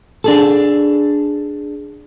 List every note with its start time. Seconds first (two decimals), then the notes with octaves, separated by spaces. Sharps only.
0.24 D4 G#4 A4